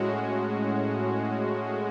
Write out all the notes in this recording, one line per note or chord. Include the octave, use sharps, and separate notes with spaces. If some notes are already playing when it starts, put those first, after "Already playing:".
Already playing: A2 G#3 C#4 F#4